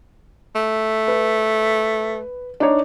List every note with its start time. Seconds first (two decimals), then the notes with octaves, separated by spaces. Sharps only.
0.55 A3
1.08 B4
2.60 D4 D#4 C#5